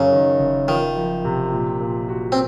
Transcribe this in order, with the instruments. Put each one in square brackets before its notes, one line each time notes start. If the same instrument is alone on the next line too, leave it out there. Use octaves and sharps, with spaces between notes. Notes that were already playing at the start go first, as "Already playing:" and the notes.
Already playing: [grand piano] F#2 [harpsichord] C#3
[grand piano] D#3
F#1
[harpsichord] D#3 [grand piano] F4
[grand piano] F3
C3
A#2
A#2
F#4
[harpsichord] C4